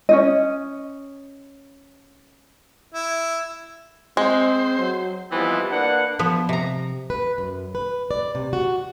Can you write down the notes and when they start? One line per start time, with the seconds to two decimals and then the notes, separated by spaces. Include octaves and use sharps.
0.09 C#4 D#4 D#5
2.94 E4
4.17 G#3 C4 C5
4.79 F#3
5.31 E3 F3 G3 G#3 B3 C4
5.71 A#3 D4 B4 F#5
6.19 F3 B3
6.49 C3 A#5
7.10 B4
7.38 F#2
7.75 B4
8.11 D5
8.35 C3
8.53 F#4